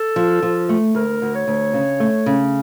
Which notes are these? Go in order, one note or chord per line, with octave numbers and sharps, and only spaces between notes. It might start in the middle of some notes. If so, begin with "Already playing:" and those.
Already playing: A4
F3
F3
A3
D2 A#4
D2
C#5
D2
C#3
A3
C#3